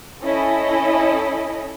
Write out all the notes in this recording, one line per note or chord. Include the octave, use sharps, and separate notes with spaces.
C#4 E4 A4 D#5